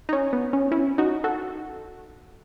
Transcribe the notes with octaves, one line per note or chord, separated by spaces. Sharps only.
D#4
C#4
B3
C#4
C#4 E4
D#4 F#4
F#4 A4